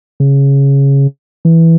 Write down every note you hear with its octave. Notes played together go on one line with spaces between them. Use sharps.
C#3
E3